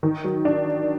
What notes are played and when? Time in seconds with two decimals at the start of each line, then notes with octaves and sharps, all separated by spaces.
0.03 D#3
0.24 F#3
0.45 D4